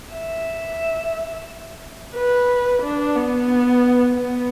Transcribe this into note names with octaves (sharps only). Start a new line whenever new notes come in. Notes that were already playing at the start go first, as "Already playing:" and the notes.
E5
B4
D4
B3
B3